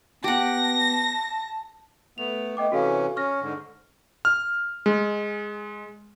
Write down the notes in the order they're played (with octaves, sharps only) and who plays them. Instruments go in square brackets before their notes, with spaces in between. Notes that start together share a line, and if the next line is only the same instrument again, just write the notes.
[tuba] B3 [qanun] G4 F#5 [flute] A5 [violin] A#6
[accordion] A3 B3 [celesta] F7
[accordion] A3 B3 [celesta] D#5 G5 D6
[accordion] C3 E3 C#4 [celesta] F#4 A4 F5
[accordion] C#4 [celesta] C#6 F6 A#6
[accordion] G#2 D3
[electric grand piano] F6
G#3